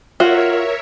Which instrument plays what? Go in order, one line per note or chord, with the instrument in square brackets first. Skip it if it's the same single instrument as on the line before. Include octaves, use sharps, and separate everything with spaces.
[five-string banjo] F4 F#4 [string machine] A#4 C#5 E5